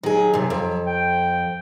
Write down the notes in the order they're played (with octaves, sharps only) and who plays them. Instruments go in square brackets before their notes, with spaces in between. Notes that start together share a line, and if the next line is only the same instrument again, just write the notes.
[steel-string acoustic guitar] D#3 G#4 [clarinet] F#3
[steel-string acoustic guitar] F#2 C3
F2
[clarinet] G5